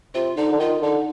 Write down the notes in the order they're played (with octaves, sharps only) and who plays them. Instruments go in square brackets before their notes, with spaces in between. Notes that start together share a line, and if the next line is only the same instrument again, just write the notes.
[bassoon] C3 [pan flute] F4
[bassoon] D3 [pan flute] D#4
[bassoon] D3
[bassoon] D#3 [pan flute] F4
[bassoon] D3 [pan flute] D#4